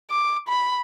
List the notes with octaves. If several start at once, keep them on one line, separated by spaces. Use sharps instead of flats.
D6
B5